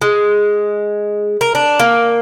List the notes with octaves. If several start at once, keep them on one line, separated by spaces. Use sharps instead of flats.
G#3
A#4
D4
A#3